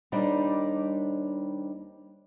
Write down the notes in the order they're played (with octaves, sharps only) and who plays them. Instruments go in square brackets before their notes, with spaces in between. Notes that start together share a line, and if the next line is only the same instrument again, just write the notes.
[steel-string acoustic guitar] D#2 G3 D4 D#4 C5